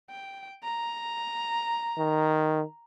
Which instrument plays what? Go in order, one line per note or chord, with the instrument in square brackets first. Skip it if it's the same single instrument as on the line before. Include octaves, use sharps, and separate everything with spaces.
[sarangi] G5
A#5
[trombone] D#3